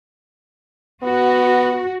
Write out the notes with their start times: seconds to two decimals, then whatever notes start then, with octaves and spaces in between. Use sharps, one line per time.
1.03 B3 F#4